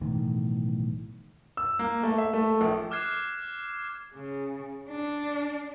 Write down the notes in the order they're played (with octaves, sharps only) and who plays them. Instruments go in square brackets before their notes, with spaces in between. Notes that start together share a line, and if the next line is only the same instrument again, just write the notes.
[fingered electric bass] B1 A2 D#3 E3
[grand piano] E6
A#3
A3
E5
A3
A#1
[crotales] D6 F6 F#6 G#6 C7 E7
[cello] C#3
D4